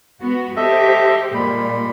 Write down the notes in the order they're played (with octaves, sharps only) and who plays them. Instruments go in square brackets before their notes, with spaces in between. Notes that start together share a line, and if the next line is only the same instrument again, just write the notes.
[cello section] G#3 B3 F#4
[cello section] G4 C5 [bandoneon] A4 D#5 E5
[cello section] A#2 [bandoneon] G3 G#3 B5